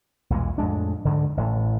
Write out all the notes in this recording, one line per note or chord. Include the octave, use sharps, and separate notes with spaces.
B1 E2 A#2 G#3
F2 A2 G#3 D4
D2 G#2 D3
A1 A2